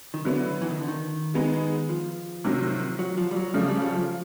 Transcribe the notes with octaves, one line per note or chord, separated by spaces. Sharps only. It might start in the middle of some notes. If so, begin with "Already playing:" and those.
D#3
D3 F#3 B3 E4
E3
D#3
D3
D#3
G#3 B3 D#4 G#4
F3
C3 D#3 F#3
F#3
F3
G3
F#3
C#3 F3 G3 A3
G3
F#3
F3